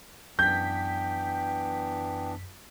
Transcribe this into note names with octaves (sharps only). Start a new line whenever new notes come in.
F#2 E3 B3 D4 G5 G6 B6